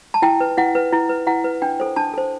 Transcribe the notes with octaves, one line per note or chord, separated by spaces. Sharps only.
A5
E4 G5
B4
E4 F#5
B4
E4
B4
E4 F#5
B4
D4 G5
A4 C5
D4 A5
A4 C5